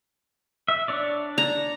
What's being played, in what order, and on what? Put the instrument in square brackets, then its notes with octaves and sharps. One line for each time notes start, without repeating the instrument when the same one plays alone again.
[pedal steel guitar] E5
D4 C#5 D5
[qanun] A#5